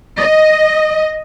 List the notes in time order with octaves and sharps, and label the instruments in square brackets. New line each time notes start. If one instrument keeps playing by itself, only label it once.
[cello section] D#5